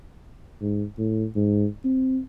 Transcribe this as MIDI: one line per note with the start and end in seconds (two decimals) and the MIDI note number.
0.61 0.84 44
0.98 1.25 45
1.36 1.66 44
1.85 2.20 60